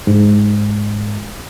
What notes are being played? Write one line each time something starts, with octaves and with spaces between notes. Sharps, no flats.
G#2